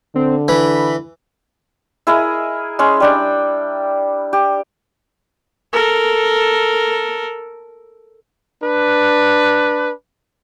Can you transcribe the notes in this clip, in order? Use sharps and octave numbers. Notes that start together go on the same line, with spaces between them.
D3 C4
E3 B5
E4 G#4 A#4 D#5
G#3 C#4
G3 D4 G5
G4
A4 A#4
D4 B4